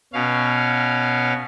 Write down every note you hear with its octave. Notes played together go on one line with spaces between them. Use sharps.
B2 C#4 F5